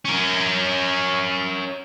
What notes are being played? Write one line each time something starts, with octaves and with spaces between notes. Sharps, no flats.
C#4 A#4